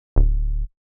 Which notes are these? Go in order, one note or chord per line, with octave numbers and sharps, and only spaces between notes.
D1